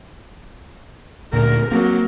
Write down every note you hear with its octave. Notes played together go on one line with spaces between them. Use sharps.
D2 A#2 A#4
F#3 A#3 C4 A#4